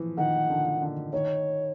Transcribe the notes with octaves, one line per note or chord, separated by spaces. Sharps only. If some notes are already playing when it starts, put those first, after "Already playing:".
Already playing: E3 F3
D#3 F#5
D3
D3
D#3 C#5